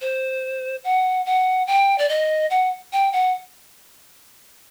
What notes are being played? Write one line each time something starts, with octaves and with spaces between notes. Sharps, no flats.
C5
F#5
F#5
G5
D5
D#5
F#5
G5
F#5